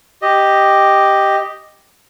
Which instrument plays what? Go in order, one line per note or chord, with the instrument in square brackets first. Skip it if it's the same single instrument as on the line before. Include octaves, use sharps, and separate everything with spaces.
[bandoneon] G4 D#5